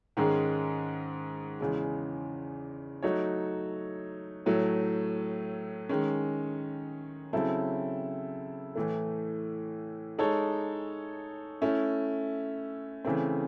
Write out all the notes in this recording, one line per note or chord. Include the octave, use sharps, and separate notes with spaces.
G#2 D#3 G#3 C#4 G#4
E2 C#3 G#3
F#3 A3 D#4 F#4 C#5
A2 F#3 A3
D#3 G#3 C#4
C#3 F#3 C4 E4 A4
A2 E3 A3
G#3 D#4 A4 C#5
A3 C#4 E4
C#3 E3 A3 C4